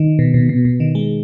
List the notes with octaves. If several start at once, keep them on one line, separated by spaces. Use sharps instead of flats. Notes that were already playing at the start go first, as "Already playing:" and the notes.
Already playing: D#3
B2
B2
B2
B2
D#3
G#3